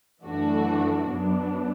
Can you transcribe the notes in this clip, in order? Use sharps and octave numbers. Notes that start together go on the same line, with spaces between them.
F#2 E3 A3 D4 F#4
F#2 F#3 B3 D4